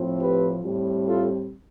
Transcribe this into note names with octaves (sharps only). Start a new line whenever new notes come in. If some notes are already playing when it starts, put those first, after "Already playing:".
Already playing: A2 F3 C4
G4 B4
A2 G3 C4
F4 A4